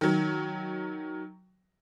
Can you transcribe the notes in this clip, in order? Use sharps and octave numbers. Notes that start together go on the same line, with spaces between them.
D#3 F#3